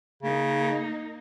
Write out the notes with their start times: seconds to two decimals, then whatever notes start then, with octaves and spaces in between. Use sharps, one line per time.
0.23 C#3 A#3 D#4